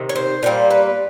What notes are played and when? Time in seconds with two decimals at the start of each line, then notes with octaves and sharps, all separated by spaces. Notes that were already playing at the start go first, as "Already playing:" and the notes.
Already playing: C3 D#3
0.09 C#5
0.16 C5
0.43 A#2 G3 A#3 C5
0.71 B4